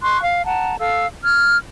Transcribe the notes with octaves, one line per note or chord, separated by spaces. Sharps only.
C6 C#6 F#6
F5
F#5 A5 A#5
A4 F5 E6
F6 G#6